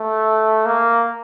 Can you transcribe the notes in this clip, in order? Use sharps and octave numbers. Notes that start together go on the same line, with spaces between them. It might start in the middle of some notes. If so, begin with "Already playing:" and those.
Already playing: A3
A#3